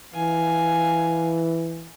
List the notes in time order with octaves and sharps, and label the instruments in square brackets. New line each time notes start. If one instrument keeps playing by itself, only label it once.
[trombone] E3 [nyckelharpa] F5 G#5